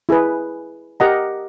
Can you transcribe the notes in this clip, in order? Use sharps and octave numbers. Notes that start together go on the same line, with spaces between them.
E4 G#4 B4
G4 A#4 D#5 F#5 A#5